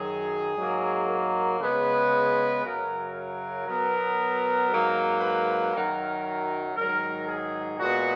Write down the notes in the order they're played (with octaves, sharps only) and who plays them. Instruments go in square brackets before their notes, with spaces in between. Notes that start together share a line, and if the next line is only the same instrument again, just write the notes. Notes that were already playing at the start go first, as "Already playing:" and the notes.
Already playing: [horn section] F#2 D#3 F#3 G#4
G#2 F#3 A#3
A#4
C#3 G#3 B3 B4
F#2 C#3 F#3 A#4
A#4
B2 F#3 B3 A#4
G#2 F#3 A#3
B4
F#2 D#3 F#3 A#4
A#4
G#2 D#3 F#3 A#4
G#4
A#2 G#3 B3 F#4